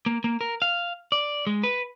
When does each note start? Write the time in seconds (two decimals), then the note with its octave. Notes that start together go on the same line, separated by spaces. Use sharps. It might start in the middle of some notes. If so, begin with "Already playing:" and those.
0.06 A#3
0.24 A#3
0.41 A#4
0.62 F5
1.12 D5
1.47 G#3
1.63 B4